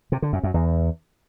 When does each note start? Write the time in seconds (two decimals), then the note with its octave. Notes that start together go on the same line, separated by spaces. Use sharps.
0.12 C3
0.22 D3
0.33 F#2
0.43 F#2
0.54 E2